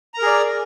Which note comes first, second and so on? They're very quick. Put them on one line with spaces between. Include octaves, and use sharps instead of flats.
A#5 A#4 G#4 D5